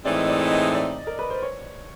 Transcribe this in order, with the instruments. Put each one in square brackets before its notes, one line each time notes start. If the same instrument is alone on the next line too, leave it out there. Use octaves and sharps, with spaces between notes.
[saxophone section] A2 E3 G#3 C4 D#4 [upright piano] D5
[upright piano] D5
D#5
D5
A#4
B4
C5
C#5